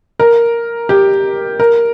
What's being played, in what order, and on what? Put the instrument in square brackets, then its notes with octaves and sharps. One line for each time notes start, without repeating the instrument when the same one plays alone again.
[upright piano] A#4
G4
A#4